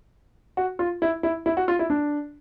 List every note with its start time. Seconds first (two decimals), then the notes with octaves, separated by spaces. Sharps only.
0.57 F#4
0.79 F4
1.02 E4
1.23 E4
1.46 E4
1.57 F#4
1.68 F4
1.79 E4
1.90 D4